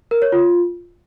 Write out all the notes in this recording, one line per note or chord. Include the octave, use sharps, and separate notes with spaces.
A#4
C#5
F4